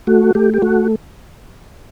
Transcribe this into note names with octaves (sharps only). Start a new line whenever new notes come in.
A3 F#4
A3 G4
G4
A3 F#4